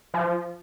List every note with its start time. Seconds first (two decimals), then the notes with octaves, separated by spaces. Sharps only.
0.14 F3